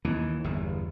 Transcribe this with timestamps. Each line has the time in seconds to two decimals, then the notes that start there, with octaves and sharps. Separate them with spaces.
0.05 D#2 E3
0.44 G1 E2